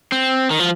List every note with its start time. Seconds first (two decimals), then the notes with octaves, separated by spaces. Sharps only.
0.12 C4
0.51 D#3
0.59 F3